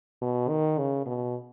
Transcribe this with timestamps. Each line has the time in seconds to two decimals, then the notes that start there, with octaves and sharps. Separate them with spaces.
0.22 B2
0.49 D#3
0.78 C#3
1.06 B2